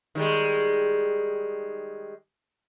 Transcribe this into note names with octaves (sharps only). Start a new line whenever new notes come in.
D#3 G3 G#3